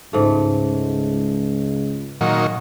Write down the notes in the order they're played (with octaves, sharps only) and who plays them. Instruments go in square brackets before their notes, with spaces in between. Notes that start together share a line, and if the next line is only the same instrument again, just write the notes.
[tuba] C#2 [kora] G#2 A3
[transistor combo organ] A#2 D#3 F#3